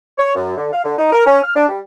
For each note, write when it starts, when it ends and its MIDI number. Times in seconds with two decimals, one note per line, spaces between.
0.18 0.33 73
0.35 0.57 42
0.57 0.69 50
0.72 0.81 77
0.84 0.97 50
0.98 1.12 63
1.12 1.24 70
1.26 1.41 61
1.43 1.51 89
1.55 1.65 62
1.69 1.80 55